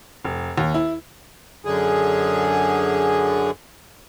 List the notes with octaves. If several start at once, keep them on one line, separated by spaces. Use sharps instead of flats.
F1
D#2
E4
F#2 D3 G#4